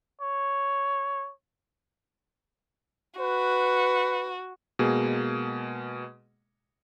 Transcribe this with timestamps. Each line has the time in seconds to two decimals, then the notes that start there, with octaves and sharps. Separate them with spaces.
0.21 C#5
3.20 F#4 B4
4.79 B2 G#3 A#3 G#4